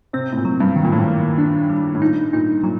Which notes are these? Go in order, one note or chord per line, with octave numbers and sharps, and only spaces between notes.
C3 C4
A2
A#2
F#3
G2
D#3
A#2
A2
A#2
A#3
D4
G3
A2
A#2 D#4
A#2 D#4
A#2 F#3